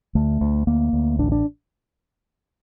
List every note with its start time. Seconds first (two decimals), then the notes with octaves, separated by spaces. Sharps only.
0.15 D2 A3
0.41 D2
0.67 D2 A#3
0.93 D2
1.19 A1 D4
1.32 D4